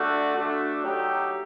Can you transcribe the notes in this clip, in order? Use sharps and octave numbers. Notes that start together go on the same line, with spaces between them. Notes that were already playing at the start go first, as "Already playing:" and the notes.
Already playing: D3 A3 D4 F#4
D3 A3 D4 F#4
F#3 A3 D#4 G4